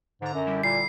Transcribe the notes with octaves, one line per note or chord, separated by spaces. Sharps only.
G#2 D3 A#5
F#2
D3 G3 E4
A#2 C7